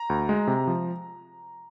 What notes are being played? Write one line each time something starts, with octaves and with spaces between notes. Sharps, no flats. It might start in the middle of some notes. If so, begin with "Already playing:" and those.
Already playing: A#5
D2
G#3
C3
F3